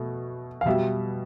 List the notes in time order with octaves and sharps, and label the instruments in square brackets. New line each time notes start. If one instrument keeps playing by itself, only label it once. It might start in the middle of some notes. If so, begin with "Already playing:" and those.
Already playing: [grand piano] B2 A3
F5
B2 G3 E5